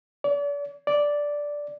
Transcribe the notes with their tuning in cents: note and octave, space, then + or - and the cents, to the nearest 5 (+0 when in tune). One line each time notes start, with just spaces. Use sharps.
D5 -40
D5 -5